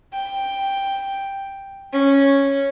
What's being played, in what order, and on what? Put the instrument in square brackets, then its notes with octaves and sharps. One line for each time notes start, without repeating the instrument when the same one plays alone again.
[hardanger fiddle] G5
C#4